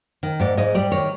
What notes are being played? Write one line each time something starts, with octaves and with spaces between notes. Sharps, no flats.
D#3
G#2 D5
G#2 D#5
G3 D5
D#3 C#5